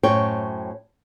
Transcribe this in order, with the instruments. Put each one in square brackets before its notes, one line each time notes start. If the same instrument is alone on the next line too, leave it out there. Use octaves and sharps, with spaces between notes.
[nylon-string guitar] F#2 A2 C4 C#5 G5